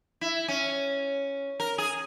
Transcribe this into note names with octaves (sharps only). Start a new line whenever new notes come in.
E4
C#4
A#4
G#4